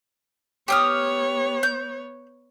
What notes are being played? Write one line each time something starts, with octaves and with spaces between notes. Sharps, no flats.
B3 G4 C#5 D#6 F6
G6